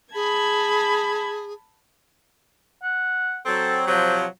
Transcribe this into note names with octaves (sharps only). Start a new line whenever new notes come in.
G#4 A5 B5 G#6
F#5
F#3 C4 A4
C3 F3 F#3 C5